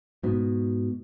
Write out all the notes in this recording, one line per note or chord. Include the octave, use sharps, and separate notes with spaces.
G#2 B2